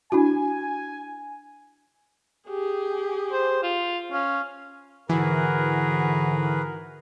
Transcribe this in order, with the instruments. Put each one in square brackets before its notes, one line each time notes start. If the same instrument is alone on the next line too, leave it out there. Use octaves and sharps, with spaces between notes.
[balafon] D4 E4 F#4 [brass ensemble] G#5
[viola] G4 G#4
[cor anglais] C5
F4
[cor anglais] C#4 [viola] F5
[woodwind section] G#2 D3 [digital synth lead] E3 [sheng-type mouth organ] F#4 G#4 B4 [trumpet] A#4